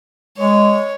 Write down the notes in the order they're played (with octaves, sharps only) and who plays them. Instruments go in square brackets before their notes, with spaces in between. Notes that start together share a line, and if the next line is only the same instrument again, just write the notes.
[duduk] G#3 [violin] C#5